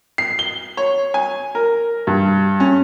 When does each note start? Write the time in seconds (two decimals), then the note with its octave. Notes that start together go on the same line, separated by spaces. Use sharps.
0.18 C7
0.39 G7
0.77 C#5
1.14 G#5
1.55 A#4
2.07 G2
2.60 C#4